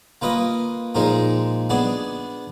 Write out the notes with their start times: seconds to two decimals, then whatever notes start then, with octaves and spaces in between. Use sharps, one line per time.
0.22 A#3 F4 B4 D#5
0.95 A#2 F3 G#3 D#4 A#4
1.70 B3 D4 G#4 D5